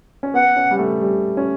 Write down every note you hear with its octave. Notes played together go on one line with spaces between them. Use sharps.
C#4
B3 F#5
C#4
G3
A3
G3
C#4